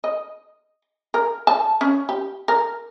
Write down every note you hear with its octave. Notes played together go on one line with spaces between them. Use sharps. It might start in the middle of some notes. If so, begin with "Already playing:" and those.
D#5
A#4
A5
C#4
G4
A#4